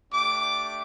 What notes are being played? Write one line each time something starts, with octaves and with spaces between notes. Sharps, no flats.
A3 D4 G4 D6